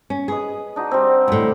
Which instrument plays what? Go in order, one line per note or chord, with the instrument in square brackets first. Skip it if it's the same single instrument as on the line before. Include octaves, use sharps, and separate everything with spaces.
[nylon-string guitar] C#4
[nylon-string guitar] G#4 [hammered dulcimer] B4 D#5
[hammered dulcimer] D4 D#4 F#4
G3 C4
[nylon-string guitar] D2 A2